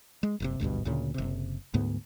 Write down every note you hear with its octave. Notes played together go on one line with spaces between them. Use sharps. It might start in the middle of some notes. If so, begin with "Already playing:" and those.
G#3
F#1 A2 C3
G#1 D2 G2 B2
D2 A#2 C#3
F#1 C3
D2 G#2 B3